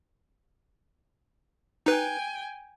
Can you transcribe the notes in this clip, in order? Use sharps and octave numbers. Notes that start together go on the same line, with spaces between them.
D#4 B4 G5 G#5